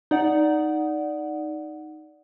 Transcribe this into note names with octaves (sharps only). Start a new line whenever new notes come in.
D#4 D5 F#5